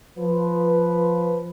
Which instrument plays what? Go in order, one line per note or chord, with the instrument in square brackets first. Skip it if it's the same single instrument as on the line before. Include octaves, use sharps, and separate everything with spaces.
[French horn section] F3 B4